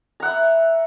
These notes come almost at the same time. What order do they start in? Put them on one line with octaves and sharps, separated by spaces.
A#5 F#5 E5 B5